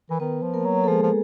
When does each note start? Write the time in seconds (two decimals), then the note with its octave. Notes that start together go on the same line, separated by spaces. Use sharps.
0.09 E3 A#4
0.20 D#3 B3 B4
0.42 F3
0.54 A#3 A#4
0.66 F#3
0.84 A4
0.88 F3 G#3 G#4
1.03 F3